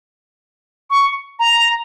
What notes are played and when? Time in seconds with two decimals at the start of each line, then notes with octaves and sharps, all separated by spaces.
0.90 C#6
1.39 A#5